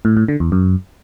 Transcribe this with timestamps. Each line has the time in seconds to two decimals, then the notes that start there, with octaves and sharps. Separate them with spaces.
0.05 A2
0.17 A2
0.28 D3
0.40 E2
0.52 F#2